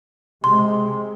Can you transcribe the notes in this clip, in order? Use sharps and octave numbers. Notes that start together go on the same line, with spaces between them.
C3 G#3 C6